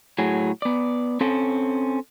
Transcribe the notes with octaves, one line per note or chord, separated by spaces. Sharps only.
A2 F#3 G#4
B3 D5
C4 C#4 A4